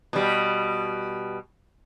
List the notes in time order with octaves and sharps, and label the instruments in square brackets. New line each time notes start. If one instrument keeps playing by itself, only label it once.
[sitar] B2 G3